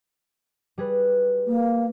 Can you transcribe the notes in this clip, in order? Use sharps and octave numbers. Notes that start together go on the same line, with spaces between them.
G3 G#4 B4
A#3